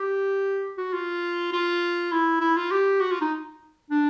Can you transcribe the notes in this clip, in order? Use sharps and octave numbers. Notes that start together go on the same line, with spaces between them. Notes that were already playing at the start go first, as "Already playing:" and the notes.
Already playing: G4
F#4
F4
F4
E4
E4
F4
G4
F#4
F4
D#4
D4